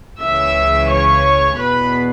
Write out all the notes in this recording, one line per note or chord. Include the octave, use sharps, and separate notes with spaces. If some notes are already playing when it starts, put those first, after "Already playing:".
C#2 C#3 E3 E5 E6
C#5 C#6
E2 B2 B4 B5